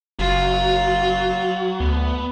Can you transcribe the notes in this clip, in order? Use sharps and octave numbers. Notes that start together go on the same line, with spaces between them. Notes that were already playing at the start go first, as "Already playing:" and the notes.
F#1 F#3 F4
D2 B3